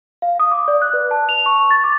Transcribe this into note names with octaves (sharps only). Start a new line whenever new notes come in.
F5
D#6
D6
D5
F#6
B4
A5
F7
C#6
A6
D6